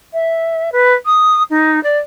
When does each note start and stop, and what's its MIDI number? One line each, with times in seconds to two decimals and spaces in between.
0.13 0.69 76
0.72 0.93 71
1.05 1.43 87
1.50 1.82 63
1.83 1.97 74